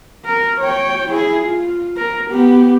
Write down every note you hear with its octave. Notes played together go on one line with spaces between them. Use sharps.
A#4
C#5 G5
E4 G#4
F4
A#4
B3 G4